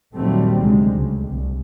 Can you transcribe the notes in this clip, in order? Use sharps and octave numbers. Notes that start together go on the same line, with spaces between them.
D#2 A#2 F#3 G3 A3 C4
D2 C3 G#3
C#2
C2